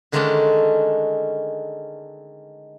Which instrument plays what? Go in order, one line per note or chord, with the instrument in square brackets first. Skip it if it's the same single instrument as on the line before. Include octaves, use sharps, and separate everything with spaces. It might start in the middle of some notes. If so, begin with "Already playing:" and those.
[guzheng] D3 D#3 G#3 A3 C#4 D4